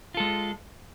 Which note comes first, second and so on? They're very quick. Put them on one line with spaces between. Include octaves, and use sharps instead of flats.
F4 A4 G#3